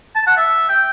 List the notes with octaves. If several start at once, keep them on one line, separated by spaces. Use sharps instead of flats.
A5
F#5
E5
G5